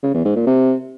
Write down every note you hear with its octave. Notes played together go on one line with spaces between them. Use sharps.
C#3
E2
G#2
A#2
C3